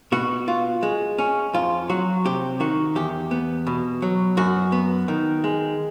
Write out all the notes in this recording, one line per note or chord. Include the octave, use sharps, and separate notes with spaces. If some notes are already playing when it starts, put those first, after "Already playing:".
B2 F#4
F4
G#3
C#4
F2 F4
F#3 F#4
C3 G4
D#3 F#4
E2 G4
B3
B2
F#3
F#2 F#4
B3
D#3
G#3